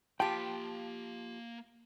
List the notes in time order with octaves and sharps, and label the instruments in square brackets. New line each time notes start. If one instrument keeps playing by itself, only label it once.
[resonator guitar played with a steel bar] F3 F4 G4 [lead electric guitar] A#3 B5 [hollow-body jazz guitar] G5 [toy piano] A5